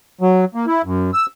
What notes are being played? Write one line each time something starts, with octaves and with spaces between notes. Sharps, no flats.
F#3
A#3
E4
F#2
E6